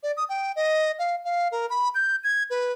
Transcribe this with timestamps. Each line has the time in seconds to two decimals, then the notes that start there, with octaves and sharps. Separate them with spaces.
0.03 D5
0.17 D#6
0.29 G5
0.56 D#5
0.99 F5
1.25 F5
1.52 A#4
1.70 B5
1.95 G6
2.24 G#6
2.50 B4